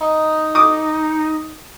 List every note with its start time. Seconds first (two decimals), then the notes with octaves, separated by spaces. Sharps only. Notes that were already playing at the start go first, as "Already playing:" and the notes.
0.01 D#4
0.55 D6 D#6